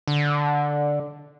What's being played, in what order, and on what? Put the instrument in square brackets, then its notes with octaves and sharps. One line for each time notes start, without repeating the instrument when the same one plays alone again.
[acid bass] D3